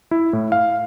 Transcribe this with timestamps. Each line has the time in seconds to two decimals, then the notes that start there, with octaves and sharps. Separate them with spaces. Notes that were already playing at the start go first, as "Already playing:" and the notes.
0.11 E4
0.33 A2
0.52 F5